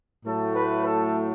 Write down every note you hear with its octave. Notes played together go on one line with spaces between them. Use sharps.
A2 F#3 A3 A4
B4
A4